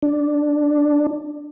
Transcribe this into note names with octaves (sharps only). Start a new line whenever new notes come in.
D4